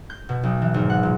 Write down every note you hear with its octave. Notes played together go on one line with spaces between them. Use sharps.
G6
B2
B1
E3
G#1
F#5
A#2